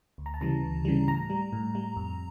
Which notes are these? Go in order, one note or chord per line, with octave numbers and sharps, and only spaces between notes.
D2
A#5
A5
C#3 E3 G3 A#5
D2
C#3 E3 G3
A2 A#5
G3
A2
G3
F2